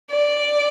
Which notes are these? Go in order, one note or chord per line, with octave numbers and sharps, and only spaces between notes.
D5